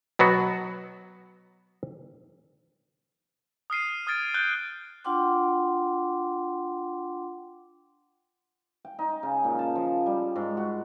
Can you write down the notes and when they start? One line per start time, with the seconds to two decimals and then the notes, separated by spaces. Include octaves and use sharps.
0.19 B2 F#3 B3 F#4
3.70 D#6 F6 C7 D#7
4.07 D#6 F6 G#6 A6 D7
4.34 F#6 G6 D7 G7
5.05 D4 F4 F#5 G5 C6 D6
8.85 G5
8.99 D#4
9.23 C#3
9.44 A#2
9.59 A5
9.75 F3
10.06 G3
10.36 G#2
10.57 F#4